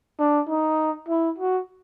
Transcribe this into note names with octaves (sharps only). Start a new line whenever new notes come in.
D4
D#4
E4
F#4